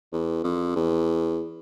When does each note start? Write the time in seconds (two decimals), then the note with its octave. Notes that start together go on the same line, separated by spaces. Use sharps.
0.13 E2
0.44 F2
0.76 E2